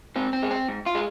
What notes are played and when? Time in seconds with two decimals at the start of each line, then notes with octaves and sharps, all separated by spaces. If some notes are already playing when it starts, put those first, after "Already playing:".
0.16 G#2 C4
0.33 C4
0.43 G#3
0.51 C4
0.68 G#2
0.86 F4
0.95 G#3